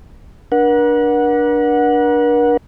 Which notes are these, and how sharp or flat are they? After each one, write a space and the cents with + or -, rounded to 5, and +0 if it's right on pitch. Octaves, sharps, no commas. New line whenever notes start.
D4 +0 A#4 +45 F#5 -10